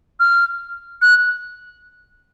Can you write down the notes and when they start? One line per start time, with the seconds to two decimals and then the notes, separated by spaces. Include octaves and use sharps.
0.20 F6
1.02 F#6